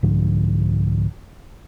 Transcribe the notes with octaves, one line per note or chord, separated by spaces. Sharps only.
C2 G#2 D3 F3